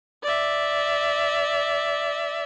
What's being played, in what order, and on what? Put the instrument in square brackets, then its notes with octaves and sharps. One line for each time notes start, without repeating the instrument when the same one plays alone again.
[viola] D5 E5